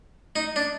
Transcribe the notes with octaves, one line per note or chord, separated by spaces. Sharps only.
D#4
D4